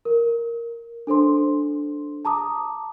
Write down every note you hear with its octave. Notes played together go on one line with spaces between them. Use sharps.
A#4
D4 A4 C5 C6
A5 A#5 D6 D#6